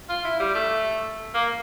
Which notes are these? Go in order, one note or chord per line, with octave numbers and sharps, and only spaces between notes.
F4
E4
G3
A3
A#3